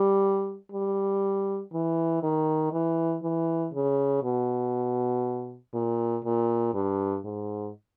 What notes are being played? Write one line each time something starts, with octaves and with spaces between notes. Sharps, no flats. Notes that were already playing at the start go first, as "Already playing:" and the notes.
Already playing: G3
G3
E3
D#3
E3
E3
C#3
B2
A#2
A#2
G2
G#2